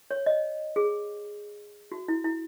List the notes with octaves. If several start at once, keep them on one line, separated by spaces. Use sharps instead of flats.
C#5
D#5
G#4
F#4
E4
E4